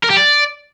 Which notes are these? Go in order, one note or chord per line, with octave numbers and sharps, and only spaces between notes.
A#4
G4
D5